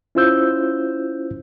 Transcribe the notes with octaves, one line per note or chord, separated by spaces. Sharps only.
C#4 E4 F4 C5 E6 G6